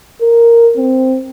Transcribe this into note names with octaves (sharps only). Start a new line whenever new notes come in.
A#4
C4